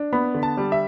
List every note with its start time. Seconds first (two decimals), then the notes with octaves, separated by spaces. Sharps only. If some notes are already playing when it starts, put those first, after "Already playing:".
Already playing: D4
0.13 B3 B5
0.34 D3
0.43 A5
0.57 G3
0.72 E5